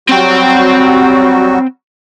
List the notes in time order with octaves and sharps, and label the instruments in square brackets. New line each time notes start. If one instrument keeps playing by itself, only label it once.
[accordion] F#3 G3 F#4 [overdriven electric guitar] C4 G5